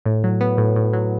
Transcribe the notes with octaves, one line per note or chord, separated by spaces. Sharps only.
A2
F#3
B3
A2
A2
F#3